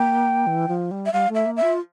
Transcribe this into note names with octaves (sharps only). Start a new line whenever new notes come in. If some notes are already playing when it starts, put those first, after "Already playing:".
Already playing: A#3 G5
E3
F3
G3
E5
G3 F5
A3
E5
A#3
E5
F4